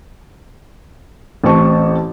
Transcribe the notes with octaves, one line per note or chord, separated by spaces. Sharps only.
A1 C4 A5 C#6